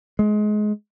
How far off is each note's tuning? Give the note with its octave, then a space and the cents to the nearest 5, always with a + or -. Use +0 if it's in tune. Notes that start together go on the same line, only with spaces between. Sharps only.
G#3 +25